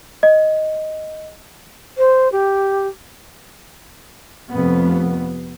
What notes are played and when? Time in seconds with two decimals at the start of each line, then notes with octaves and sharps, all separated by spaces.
0.23 D#5
1.97 C5
2.32 G4
4.52 F1 F2 B3